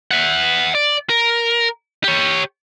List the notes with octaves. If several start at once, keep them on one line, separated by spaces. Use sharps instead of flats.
E5 F#5
D5
A#4
G4 C#5